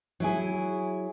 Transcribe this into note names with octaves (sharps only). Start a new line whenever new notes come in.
F#3 E4 G#4